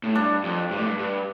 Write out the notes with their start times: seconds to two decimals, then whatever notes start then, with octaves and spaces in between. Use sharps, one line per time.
0.03 A2
0.15 G2 D4
0.43 F2
0.71 G2
0.78 A2
0.85 G2
0.99 G2